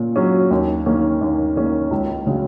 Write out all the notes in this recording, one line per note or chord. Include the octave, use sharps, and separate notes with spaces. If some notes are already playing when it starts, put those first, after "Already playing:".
Already playing: A#2 C#4
F#3 C#4
D#2
D#3 A#3 C#4
D#2
D#3 A#3 C#4
C#2
C#3 G#3 C#4 F#4